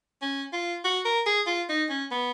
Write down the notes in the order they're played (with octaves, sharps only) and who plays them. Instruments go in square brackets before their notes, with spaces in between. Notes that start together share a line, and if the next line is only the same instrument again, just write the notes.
[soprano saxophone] C#4
F4
F#4
A#4
G#4
F4
D#4
C#4
B3